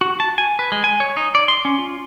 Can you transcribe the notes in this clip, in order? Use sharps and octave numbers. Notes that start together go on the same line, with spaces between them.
F#4
A5
G#5
B4
G#3
G#5
C#5
D#4
D5
C6
C#4
F4